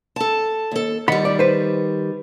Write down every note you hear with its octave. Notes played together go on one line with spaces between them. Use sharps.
A4 A5
D#2 A4
D#3 G3 F#5 B5
D5
B4 C5